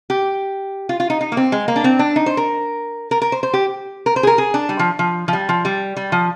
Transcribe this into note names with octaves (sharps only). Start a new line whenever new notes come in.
G4
F4
F4
D#4
D#4
A#3
C4
G#3
A#3
D4
C4
D4
D#4
C5
A#4
A#4
A#4
C5
C5
G4
A#4
C5
G#4
A#4
G#4
D4
G3
F3
F3
F3
G3
F3
G3
G3
F3